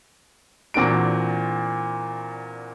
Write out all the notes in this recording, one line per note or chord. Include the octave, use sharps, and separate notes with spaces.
E2 A#2 C4 D4 F#4 D7